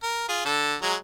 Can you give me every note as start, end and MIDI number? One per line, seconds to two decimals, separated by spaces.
0.03 0.24 70
0.29 0.43 65
0.29 0.43 68
0.45 0.75 50
0.45 0.75 69
0.82 0.95 54
0.82 0.95 56
0.82 0.95 82